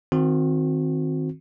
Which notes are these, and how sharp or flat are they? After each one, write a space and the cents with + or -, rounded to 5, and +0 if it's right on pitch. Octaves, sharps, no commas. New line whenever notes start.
D#3 +0 C4 +0 F#4 -30